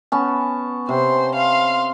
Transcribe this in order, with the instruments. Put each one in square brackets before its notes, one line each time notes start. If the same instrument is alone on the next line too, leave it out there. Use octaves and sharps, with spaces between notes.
[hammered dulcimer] B3 C#4 A5
[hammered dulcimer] C3 [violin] C5
[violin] F5 C6